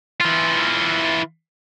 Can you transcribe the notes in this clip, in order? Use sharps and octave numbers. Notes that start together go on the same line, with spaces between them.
E3 F4